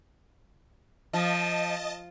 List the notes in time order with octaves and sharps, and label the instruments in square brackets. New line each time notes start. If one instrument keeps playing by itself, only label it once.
[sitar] F3 [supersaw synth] D#5 A5